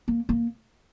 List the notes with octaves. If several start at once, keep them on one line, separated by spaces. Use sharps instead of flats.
A#3
A#3